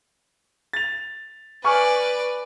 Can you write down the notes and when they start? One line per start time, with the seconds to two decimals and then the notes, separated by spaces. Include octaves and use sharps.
0.73 A6 F7
1.64 B4 D5 G#5 C#6 F6